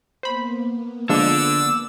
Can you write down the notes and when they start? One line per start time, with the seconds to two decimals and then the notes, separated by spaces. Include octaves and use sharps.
0.23 A#3 B3 C5 B5
1.09 D3 F3 G#3 D4 D5 E6